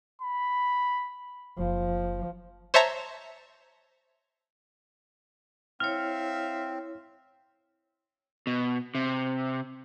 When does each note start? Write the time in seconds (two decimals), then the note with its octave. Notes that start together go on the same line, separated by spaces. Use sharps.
0.21 B5
1.58 F#1 F3
2.74 C5 C#5 E5 A5 A#5
5.80 C4 E4 C#5 E5 F5 F6
8.47 B2
8.95 C3